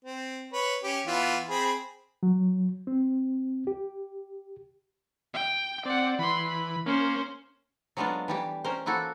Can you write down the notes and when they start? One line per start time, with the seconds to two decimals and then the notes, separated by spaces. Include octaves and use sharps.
0.05 C4
0.53 B4 C#5
0.83 C#4 G4
1.07 E3 B3 F4
1.50 C4 G#4 B5
2.23 F#3
2.87 C4
3.67 G4
5.34 G5
5.86 C4 D5 F#5
6.19 E3 B5 C6
6.48 B5
6.86 A#3 C#4 C5
7.97 F#3 G#3 A3 B3 D4 F4
8.28 E3 G3 G4
8.64 C#4 A#4 C5
8.86 A#3 E4 F#4 A4